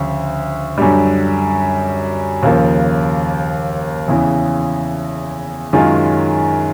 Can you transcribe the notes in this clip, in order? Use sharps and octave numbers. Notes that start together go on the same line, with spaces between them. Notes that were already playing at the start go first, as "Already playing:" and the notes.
Already playing: D2 C#3 F3
F#2 D3 G3
D#2 C#3 F3 A#3
E2 C#3 E3
F#2 D#3 G#3 C#4 F4